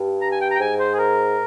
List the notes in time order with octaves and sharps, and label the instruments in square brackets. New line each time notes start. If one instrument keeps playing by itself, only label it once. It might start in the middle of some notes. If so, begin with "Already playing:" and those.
Already playing: [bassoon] G2
[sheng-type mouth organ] A#5
G#5
G5
A#5
G5
[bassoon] G#2 [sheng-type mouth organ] G#5
[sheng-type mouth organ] C5
G#4
A#4